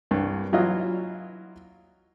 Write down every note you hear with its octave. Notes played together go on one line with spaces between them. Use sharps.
C2 G2
E3 F#3 E4 F4 D#5 F5